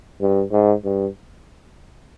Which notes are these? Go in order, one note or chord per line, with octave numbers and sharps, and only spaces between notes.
G2
G#2
G2